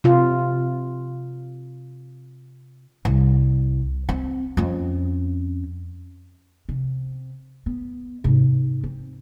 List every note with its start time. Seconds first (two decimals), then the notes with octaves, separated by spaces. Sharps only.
0.04 C3 F4
3.05 C2
4.09 C4
4.57 F2 C#4
6.69 C3
7.66 B3
8.24 G#2 C3
8.84 C4